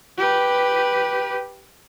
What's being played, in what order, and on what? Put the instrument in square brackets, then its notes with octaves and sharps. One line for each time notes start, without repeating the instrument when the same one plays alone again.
[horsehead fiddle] G4 B4